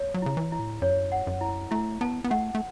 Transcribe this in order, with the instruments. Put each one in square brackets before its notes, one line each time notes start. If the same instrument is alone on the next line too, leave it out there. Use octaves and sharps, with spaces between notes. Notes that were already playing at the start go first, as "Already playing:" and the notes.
Already playing: [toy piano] C#5
[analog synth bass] F#3
[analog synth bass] C#3 [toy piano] E4
[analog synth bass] E3
[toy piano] E4
[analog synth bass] A2
[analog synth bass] F#2 [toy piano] C#5
[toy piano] F#5
[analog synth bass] F#2
[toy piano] E4
[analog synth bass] A3 [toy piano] E4
[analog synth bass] B3 [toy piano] A5
[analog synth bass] B3
[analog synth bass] A3 [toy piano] F#5
[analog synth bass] A3